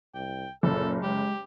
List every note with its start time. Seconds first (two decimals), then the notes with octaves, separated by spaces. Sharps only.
0.14 C2 G5
0.63 F#1 A#2 A4
1.03 G#3 G4